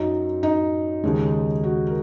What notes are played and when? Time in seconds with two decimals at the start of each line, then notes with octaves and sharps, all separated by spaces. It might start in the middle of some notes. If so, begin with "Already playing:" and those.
Already playing: F#2 F#3 D#4
0.43 D#4
1.04 D#2 C#3 G#3
1.63 F#4
1.87 A#4